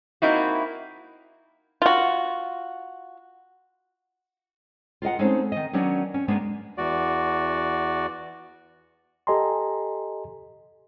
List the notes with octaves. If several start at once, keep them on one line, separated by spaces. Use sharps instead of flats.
A#3 C4 D#4 E4 F#4
F4 F#4
F4 A#4 D#5 F#5
G#3 A3 C4 C#4 D#4
D#3 D#5
D#3 F#3 B3 C#4 D4
C#4
G#3 A#3 B3 D4
E2 F#4 D5
G4 A4 D#5 G#5 A#5 C6